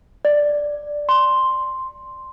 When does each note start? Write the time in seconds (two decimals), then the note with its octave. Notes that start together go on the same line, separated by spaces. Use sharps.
0.25 D5
1.09 C6